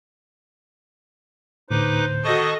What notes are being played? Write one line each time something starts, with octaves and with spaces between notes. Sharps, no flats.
D2 A2 D3 D#4 B4 C5 D6
D#3 F#4 A4 D#5 A5 C#6